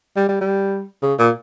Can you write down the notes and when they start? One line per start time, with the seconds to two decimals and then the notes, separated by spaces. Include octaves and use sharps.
0.16 G3
0.29 G3
0.41 G3
1.02 C#3
1.19 A#2